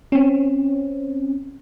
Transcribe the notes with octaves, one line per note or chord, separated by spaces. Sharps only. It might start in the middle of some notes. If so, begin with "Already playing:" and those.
C4 C#4